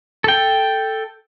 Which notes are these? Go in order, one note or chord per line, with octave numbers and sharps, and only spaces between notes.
A4 G5